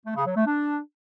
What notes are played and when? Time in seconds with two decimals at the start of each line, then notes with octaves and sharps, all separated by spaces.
0.06 A3
0.16 C#3
0.26 F#3
0.36 A3
0.46 D4